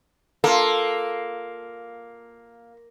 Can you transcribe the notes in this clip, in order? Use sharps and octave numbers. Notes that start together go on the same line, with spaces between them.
A#3 F4 A4